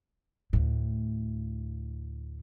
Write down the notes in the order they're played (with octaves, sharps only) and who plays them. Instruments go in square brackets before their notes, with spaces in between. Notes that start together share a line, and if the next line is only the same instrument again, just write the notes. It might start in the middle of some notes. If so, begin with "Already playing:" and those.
[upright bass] D2 A2